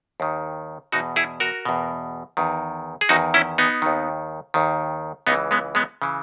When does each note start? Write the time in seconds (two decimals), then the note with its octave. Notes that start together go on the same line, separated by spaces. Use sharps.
0.20 D#2 D#3
0.92 E2 B2 D#4 F#4
1.16 E4 G#4
1.40 F#4 A#4
1.65 E2 B2
2.37 E2 D#3
3.01 G#4
3.09 E2 D#3 D#4 F#4
3.34 C#4 E4
3.58 B3 D#4
3.82 D#2 D#3
4.54 D#2 D#3
5.27 C#2 C#3 E3 B3 D#4
5.51 G#3 B3
5.75 G#3 B3
6.02 C#3 E3